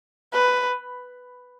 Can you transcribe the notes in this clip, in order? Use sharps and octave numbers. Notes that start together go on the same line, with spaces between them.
B4